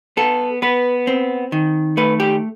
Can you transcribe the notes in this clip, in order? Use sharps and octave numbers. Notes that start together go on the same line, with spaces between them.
B3 A4
B3 B4
C4
D#3
A3 B4
G4